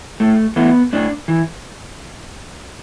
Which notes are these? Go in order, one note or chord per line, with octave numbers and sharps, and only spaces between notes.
A2 A3
E3 A3 B3
A2 D4
E3